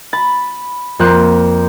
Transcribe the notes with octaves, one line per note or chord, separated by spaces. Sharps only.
B5 A6
F2 A#3 C5 F#6